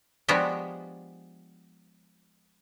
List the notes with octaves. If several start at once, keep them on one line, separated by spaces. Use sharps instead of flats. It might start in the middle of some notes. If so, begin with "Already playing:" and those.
F3 G#3 B3 D4 F#4 G4